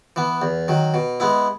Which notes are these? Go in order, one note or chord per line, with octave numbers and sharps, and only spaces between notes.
E3 B3
E2
D#3 F#3
B2
G#3 B3 E4